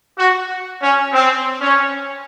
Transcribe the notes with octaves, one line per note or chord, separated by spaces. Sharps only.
F#4
C#4
C4
C#4